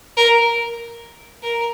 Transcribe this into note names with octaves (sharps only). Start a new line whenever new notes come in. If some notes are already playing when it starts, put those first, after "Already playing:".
A#4
A#4